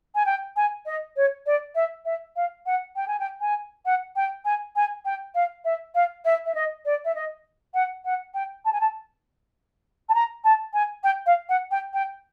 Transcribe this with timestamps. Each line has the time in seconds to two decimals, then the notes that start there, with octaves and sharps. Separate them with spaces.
0.15 G#5
0.26 G5
0.56 G#5
0.86 D#5
1.16 C#5
1.46 D5
1.75 E5
2.05 E5
2.36 F5
2.66 F#5
2.96 G5
3.08 G#5
3.20 G5
3.41 G#5
3.85 F#5
4.16 G5
4.45 G#5
4.76 G#5
5.05 G5
5.35 F5
5.65 E5
5.95 F5
6.25 E5
6.45 E5
6.55 D#5
6.85 D5
7.05 E5
7.15 D#5
7.74 F#5
8.05 F#5
8.34 G5
8.65 A5
8.73 G#5
8.81 A5
10.09 A5
10.14 A#5
10.44 A5
10.74 G#5
11.04 G5
11.26 F5
11.49 F#5
11.71 G5
11.94 G5